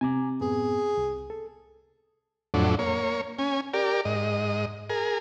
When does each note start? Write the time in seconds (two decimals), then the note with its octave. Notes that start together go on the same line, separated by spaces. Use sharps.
0.01 C3 G#5 A#5 D6
0.41 F#2 A2 B3 G#4
0.97 C2
1.30 A4
2.54 F2 A2 F#3 D4
2.79 A#3 C#5
3.39 C#4 G#5
3.74 G4 A#4 D5
4.05 G#2 D#5
4.90 G#4 A#4